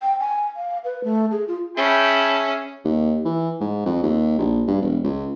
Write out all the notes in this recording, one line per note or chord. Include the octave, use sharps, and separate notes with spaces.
G5
G#5
F5
B4
A3
G#4
F4
C#4 G#4 E5 G5 A5 B5
D#2
E3
G#2
F2
D#2
A#1
G2
E1
C#2